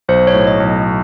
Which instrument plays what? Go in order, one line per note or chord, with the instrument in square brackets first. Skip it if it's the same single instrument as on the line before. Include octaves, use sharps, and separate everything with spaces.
[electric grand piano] B1 [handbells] C5
[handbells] C#5
[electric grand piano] A2
[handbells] D#5
[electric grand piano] B1